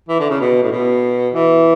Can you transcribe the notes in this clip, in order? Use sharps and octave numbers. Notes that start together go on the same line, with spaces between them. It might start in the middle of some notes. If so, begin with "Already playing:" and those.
E3
D3
C#3
B2
A2
B2
E3